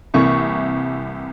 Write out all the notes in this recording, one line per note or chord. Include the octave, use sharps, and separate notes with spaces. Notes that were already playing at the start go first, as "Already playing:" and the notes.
C2 C3 E3 A#3 C#6